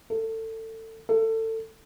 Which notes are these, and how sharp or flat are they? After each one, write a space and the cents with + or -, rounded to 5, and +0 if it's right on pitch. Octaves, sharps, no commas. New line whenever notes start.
A4 +25
A4 +25